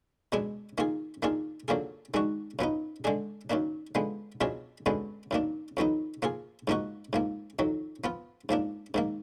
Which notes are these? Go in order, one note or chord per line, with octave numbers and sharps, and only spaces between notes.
B2 G#3 D4 G#4
D#3 A#3 F4 G#4
D#3 A#3 D4 F4 G#4
D3 F#3 A#3 F4 G#4
D#3 G#3 D4 F#4
F#2 F3 B3 D#4
D3 G#3 D4 G#4
F#2 D#3 A#3 D4
D3 F3 G#3 B3
B2 F#3 D4 F4 G#4
F#2 D3 G#3 B3
F#2 D#3 A#3 D4
F2 D#3 F#3 B3 D#4
F3 A#3 F4 G#4
G#2 F3 A#3 D#4 F#4
G#2 F3 A#3
F2 D#3 F#3
F3 B3 F4
G#2 F3 A#3 D4
G#2 D#3 A#3